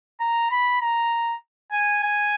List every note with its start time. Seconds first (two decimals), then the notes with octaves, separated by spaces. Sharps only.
0.20 A#5
0.51 B5
0.81 A#5
1.72 G#5
2.03 G#5